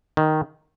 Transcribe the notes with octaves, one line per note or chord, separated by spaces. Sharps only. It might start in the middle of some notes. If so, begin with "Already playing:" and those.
D#3